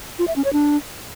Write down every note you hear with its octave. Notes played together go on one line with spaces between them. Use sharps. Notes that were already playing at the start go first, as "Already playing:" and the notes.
F4
E5
C#4
C#5
D4